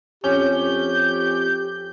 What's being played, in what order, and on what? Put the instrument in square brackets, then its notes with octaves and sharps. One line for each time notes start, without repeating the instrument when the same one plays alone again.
[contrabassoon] F2 [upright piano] C#4 [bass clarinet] G4 [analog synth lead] G6